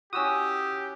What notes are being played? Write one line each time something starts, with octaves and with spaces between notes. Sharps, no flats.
C#4 E4 F#4 G4 D#6 E6